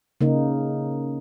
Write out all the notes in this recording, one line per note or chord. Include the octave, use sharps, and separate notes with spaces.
C#3 A#3 D#4